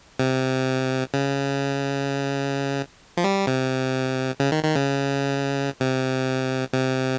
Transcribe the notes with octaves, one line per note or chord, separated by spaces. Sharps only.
C3
C#3
F3
G3
C3
C#3
D#3
D#3
C#3
C3
C3